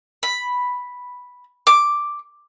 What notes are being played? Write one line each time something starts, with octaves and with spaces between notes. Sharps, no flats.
B5
D6